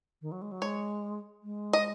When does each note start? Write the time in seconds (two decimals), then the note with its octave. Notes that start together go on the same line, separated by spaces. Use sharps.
0.22 D#3
0.32 F#3
0.42 G#3
0.52 F#3
0.62 G#3 C#5
1.43 G#3
1.73 D#5